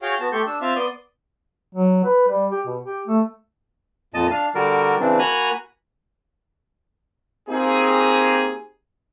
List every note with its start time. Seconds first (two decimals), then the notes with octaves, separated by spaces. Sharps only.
0.02 F#4 G#4 C#5 F5 G5
0.20 B3 F#4 A5
0.32 A3 G4 A4 C6 C#6 G6
0.47 D4 E6
0.61 C4 F4 E5 F5
0.76 B3 D5 C6 D#6
1.75 F#3
2.05 B4
2.28 G3
2.52 G4
2.66 B2
2.84 G4
3.07 A3
4.14 F2 A#2 D#5 A5
4.31 D4 F5
4.55 D3 G3 F#4 A#4 D5
5.00 C#3 E3 C4 D4
5.19 A#3 F#4 G#5 A#5 B5 F#6
7.49 A#3 C4 D#4 F4 G4 G#4